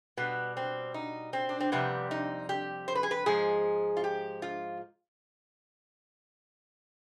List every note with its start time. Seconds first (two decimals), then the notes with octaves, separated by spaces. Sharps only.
0.17 B2 G3 B3
0.57 C4
0.94 D#4
1.33 C4
1.49 D4
1.60 C4
1.72 F2 C3 G3 B3
2.11 D#4
2.49 G4
2.88 C5
2.95 B4
3.03 G#4
3.11 B4
3.26 G#2 F3 G#3 G#4
3.97 F4
4.04 G4
4.42 F4